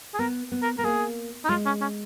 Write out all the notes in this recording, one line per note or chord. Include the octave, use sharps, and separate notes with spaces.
G#4
B3 A#4
B3
A#4
B3 A#4
A#3 G#4
D#4
G#3 F4
C#4
C#4